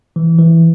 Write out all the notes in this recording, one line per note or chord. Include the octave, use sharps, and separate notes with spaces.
E3
E3